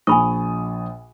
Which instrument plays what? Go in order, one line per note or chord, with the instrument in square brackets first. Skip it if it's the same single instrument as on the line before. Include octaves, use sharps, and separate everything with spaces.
[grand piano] A#1 D#6 [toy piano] G#5 B5 C#6